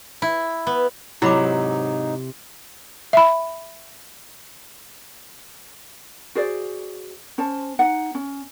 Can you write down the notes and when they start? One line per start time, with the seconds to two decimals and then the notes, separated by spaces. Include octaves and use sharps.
0.22 E4
0.67 B3
1.22 G#2 C3 F#3 D#4 E4 B5 D6
3.13 E5 B5
6.35 F#4 G#4 C5 D5
7.38 C#4 C5 A5
7.79 D#4 F#5
8.15 C#4